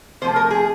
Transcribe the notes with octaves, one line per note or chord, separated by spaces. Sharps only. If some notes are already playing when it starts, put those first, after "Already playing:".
C3 F3 A3 C5
A#4
G#4